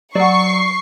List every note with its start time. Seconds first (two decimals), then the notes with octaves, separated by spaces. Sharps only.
0.15 F#3 D5 F#5 C#6 C7